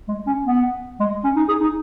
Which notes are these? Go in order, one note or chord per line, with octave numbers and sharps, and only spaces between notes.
G#3
C#4
B3
G#3
C#4
D#4
G#4
D#4